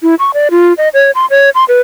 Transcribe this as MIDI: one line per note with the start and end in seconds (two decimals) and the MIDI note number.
0.03 0.15 64
0.19 0.31 85
0.34 0.48 74
0.51 0.73 65
0.78 0.89 75
0.94 1.11 73
1.15 1.26 84
1.30 1.50 73
1.55 1.64 84
1.68 1.81 71